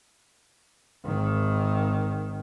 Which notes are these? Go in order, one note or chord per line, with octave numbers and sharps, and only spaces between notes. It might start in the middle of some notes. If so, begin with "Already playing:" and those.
G#1 D#3